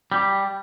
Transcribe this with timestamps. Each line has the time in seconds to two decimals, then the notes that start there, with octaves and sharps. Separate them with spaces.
0.12 G3